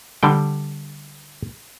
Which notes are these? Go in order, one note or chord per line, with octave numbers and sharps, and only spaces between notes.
D3 G3 G5